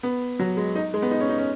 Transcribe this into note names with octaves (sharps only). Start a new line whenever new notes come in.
B3
F#3
G#3
D#4
G#3
B3
D#4
C#4
D#4
C#4